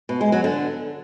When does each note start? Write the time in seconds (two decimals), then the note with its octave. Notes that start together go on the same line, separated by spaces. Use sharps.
0.09 B2
0.21 G#3
0.32 F#3
0.44 D3